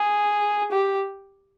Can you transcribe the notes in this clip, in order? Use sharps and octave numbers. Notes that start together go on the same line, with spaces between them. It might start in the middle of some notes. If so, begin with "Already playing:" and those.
Already playing: G#4
G4